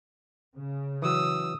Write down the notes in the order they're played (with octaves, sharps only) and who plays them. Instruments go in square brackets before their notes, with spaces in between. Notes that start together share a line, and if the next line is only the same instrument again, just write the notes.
[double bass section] C#3
[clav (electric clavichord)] E3 F#3 [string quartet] D#6 E6